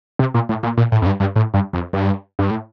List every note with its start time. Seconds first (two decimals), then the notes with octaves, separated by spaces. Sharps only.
0.19 C3
0.34 A#2
0.49 A2
0.63 A#2
0.77 A#2
0.92 A2
1.02 F2
1.06 G2
1.20 G2
1.36 A2
1.54 G2
1.73 F2
1.93 G2
2.39 G2
2.51 A2